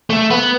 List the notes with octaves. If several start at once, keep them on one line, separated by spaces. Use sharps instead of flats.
A3
B3